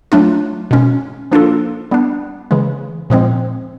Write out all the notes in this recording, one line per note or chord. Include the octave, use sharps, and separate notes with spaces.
F#3 A3 D4 F4
B2 G#3 C#4
F3 A#3 D4 F4 A4
G3 B3 D4
C#3 E3 G#3
A#2 F3 G#3 C4